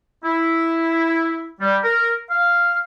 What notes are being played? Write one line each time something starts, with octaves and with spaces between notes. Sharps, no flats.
E4
G3
A#4
F5